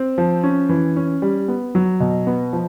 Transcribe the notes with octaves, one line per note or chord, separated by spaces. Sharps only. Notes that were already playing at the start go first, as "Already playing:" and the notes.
Already playing: C4
F3
C#4
E3
C#4
G3
B3
F#3
B2
B3
F3